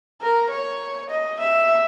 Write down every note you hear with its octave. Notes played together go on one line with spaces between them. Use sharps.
A#4
C#5
D#5
E5